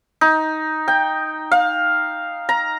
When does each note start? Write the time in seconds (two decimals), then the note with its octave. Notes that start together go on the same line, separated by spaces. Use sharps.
0.21 D#4
0.88 G5
1.51 F5
2.49 A#5